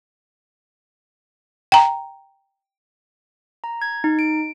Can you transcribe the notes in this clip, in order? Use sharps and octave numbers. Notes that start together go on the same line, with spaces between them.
G5 A#5
A#5
G#6
D#4
D7